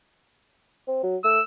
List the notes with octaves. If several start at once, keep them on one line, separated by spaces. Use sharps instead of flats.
C4
F#3
A3 E6